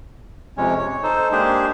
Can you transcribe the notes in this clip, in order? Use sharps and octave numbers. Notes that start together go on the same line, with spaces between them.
F2 C3 G#3 C#4 C#5
C#5
D#4 A4 C5
G#3 A#3 D4 G4 G#4 C5